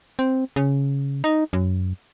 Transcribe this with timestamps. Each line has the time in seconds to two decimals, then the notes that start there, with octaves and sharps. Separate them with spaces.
0.19 C4
0.56 C#3
1.24 D#4
1.53 F#2